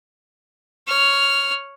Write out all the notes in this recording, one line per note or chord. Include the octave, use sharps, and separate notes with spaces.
C#5 F6